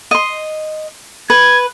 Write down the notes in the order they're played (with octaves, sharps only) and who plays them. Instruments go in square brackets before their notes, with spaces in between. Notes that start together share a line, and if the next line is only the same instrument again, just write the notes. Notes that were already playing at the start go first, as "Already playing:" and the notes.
[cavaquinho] D#5 C6
[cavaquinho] B4 [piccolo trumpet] G#6